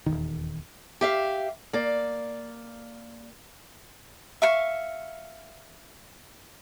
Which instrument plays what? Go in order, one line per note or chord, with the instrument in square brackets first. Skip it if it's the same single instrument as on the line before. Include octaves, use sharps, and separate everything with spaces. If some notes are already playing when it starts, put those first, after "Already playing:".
[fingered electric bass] D#1 B1 E2 D#3
[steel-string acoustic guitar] G4 E5 F5
A#3 D5
[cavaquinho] E5 F5 C#6